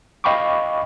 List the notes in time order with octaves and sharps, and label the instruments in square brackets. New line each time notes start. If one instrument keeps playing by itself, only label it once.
[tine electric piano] D#5 F5 G5 B5 C#6 D6